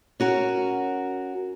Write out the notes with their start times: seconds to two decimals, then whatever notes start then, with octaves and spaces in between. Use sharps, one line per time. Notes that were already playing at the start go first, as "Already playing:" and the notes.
0.20 C#4 F#4 A#4